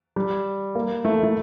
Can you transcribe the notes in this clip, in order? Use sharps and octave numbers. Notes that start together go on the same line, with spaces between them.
G3
A#3
A3
A3